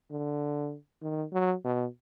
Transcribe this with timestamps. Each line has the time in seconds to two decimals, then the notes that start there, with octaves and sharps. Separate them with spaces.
0.11 D3
1.03 D#3
1.33 F#3
1.64 B2